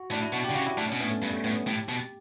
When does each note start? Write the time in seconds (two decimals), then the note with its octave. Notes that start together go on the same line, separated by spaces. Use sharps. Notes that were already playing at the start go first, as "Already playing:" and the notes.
Already playing: F#4
0.11 A2 D4
0.22 E4
0.32 B2 F#4
0.44 G4
0.50 D3
0.55 C#3 F#4
0.66 E4
0.77 A2 D4
0.88 C#4
0.92 B2
1.00 A2 B3
1.11 A3
1.22 G2 G3
1.33 A3
1.44 A2 B3
1.55 B3
1.66 A2 G4
1.89 B2